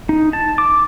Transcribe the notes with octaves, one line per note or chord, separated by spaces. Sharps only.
D#4
A5
D6